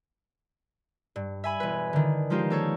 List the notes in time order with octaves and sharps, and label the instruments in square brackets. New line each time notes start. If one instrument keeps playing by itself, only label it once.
[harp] G2
E5 G#5 B5
E1 B4
D3 D#3
F3 G#3 D#4 F4 G4
A#3 A4 C#5